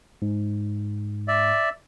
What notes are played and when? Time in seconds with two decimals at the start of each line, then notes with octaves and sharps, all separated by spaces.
0.22 G#2
1.28 D5 E5